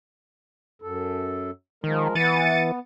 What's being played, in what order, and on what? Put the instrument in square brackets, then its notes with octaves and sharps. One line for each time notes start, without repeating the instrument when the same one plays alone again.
[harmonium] F#2 A4
[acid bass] D#3 [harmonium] F3 G#3 A#4
[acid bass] E3 [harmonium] B3 [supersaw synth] A6 C#7 D#7